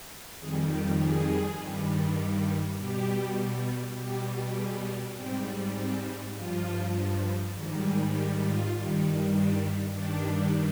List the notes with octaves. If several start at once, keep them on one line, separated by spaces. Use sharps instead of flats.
F2 D#3 G3 G#4
G4
G#4
G2 D#3 G3
B2 G3 G4
B2 G3 G4
G#4
G4
G#2 G3 C4
C4
G2 F3 F4
G#2 D#3 G3
G#4
G4
F4
G2 D#3 G3
D4
G2 D#3 G3 D4